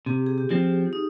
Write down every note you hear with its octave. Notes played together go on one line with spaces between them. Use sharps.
C3 G4
G#4
G4
F3 C4 F4
D#4